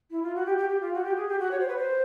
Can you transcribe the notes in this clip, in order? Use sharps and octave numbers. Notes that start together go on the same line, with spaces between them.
E4
F4
F#4
G4
G4
G4
F4
F#4
G4
G#4
G4
F#4
C#5
C5
B4
C5